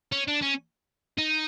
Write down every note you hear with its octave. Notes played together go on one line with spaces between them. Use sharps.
C#4
D4
C#4
D#4